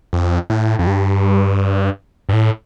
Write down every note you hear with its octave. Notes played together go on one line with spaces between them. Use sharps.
F2
A2
F2
G2
G2
A2